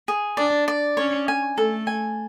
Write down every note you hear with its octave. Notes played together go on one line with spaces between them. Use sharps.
G#4
D4 D5
D5
C#4 C#5
G#5
A3 A4
G#5